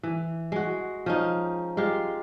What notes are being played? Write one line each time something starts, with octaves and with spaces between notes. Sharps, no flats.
E3
G#3 F#4
F3 C#4 D#4
G#3 F4 G4